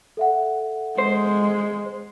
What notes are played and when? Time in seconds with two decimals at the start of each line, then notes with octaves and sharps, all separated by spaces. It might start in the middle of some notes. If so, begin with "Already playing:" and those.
0.17 A4 E5 F#5
0.98 G#3 C5